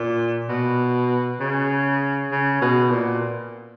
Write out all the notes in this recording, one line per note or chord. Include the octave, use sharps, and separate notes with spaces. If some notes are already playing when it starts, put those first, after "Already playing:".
Already playing: A#2
B2
C#3
C#3
B2
A#2